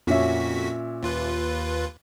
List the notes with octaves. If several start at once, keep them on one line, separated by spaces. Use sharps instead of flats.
F2 A#2 C#4 F#4 E5 B6
D#2 F4 B4